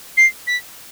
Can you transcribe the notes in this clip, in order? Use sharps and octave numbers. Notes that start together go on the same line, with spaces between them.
C7
B6